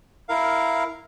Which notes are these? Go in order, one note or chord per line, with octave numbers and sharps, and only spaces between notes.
E4 A#4 F5